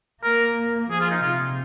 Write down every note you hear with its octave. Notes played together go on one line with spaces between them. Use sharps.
A#3 A#4
F3 G#4
F4
D#4
C3 F4